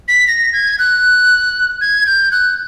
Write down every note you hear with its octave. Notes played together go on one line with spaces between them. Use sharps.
B6
A#6
G#6
F#6
G#6
G6
F#6